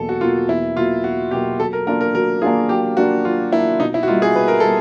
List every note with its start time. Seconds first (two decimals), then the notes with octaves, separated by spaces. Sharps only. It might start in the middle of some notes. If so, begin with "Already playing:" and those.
Already playing: E2 B2 F#3 A#3 A4
0.09 F#4
0.21 B2 F#3 A#3 F4
0.48 E2 E4
0.76 B2 F#3 A#3 F4
1.04 E2 F#4
1.31 B2 F#3 A#3 G4
1.59 F#3 A4
1.73 A#4
1.87 A#3 D4 F4 A#4
2.01 A#4
2.14 F#3 A#4
2.42 A#3 D4 F4 G#4
2.69 F#3 G4
2.97 A#3 D4 F4 F#4
3.25 F#3 F4
3.52 A#3 D4 E4 F4
3.80 B2 D#4
3.94 E4
4.03 F#4
4.08 G3 A#3 D#4 F4
4.22 G#4
4.35 B2 B4
4.48 A#4
4.60 G3 A#3 A4